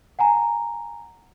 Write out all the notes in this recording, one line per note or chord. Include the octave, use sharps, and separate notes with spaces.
F#5 G#5 A#5